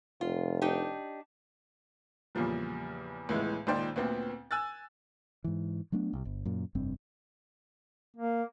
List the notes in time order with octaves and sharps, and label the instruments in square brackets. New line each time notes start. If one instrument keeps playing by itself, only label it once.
[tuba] F1 [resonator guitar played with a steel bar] F4
[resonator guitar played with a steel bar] D4 D#4 G4
[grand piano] E2 A#2 C#3 F3 G3
C#2 A2 E3 G#3 B3
C#2 A#2 D#3 C5 D5 G5
D2 A#2 B3 C4
G#5 E6 F#6 A6
[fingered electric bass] G#2 E3
F#3 A3 B3 D4
C2
G1
F#2 A#2
F1 G2 C4
[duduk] A#3